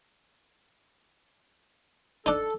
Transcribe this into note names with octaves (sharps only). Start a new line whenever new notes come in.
D4 D#4 A4